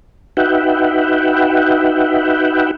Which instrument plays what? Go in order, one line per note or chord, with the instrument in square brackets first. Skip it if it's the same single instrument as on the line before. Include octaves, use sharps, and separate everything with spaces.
[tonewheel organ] D#4 F#4 B4 E5 F#5 G5